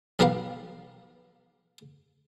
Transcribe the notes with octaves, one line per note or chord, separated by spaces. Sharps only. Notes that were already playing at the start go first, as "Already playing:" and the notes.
B1 G3 A#4 B4 F5 F#5